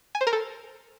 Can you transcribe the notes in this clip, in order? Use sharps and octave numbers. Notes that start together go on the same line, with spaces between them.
G#5
C5
A#4
A4